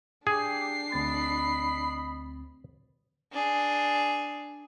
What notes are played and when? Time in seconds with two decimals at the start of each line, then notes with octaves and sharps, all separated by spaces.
0.27 D4 G4 G#4 C7
0.92 D2 C4 D#5 B5 A6
3.33 D4 G#4